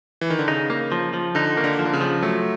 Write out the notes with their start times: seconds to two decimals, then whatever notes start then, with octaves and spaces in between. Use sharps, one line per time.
0.21 E3
0.30 D#3
0.39 D3
0.48 C#3 D#4
0.70 A#3
0.92 F3
1.14 F3
1.35 D3 D#4
1.57 D#3 A#3
1.64 D3
1.79 F3
1.85 D3
1.93 C#3
2.01 F3
2.22 F#3 A3